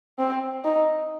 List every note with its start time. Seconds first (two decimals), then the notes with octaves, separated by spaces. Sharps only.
0.19 C4
0.65 D#4